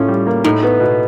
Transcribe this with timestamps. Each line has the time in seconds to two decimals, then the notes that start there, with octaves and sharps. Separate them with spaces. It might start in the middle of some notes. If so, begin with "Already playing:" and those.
Already playing: A2 C#4 F4
0.08 G3
0.27 A#3
0.44 A2 D#4
0.63 B3
0.80 B2